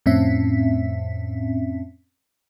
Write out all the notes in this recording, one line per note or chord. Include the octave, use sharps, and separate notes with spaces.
F2 A2 C4 C#4 E5 B6